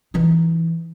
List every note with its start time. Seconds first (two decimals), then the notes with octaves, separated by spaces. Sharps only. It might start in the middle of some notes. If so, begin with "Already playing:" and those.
0.14 E3 D#4